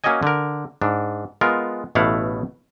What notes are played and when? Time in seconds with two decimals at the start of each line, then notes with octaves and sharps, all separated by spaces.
0.04 A#3 C#4 F#4 C#5 D#5 G#5
0.23 D3 A#4
0.82 G#2 D4
1.41 G#3 B3 F4 A#4
1.95 A1 B2 A3 E4 F5 F#5